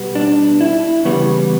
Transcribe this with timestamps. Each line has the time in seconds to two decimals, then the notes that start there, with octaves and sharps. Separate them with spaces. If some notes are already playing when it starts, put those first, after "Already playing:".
Already playing: B2 G3 B3
0.15 D4
0.61 E4
1.05 E2 C#3 G3 B3 F#4